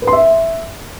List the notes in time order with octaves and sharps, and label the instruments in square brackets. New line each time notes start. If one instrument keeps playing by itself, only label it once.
[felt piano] B4
C6
E5